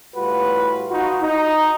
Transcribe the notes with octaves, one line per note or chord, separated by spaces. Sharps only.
A2 G3 F4 F#4 B4
D#4 F4 F#4
D#4